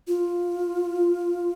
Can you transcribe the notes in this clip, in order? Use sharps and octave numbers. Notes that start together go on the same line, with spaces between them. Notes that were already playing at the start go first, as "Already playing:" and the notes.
F4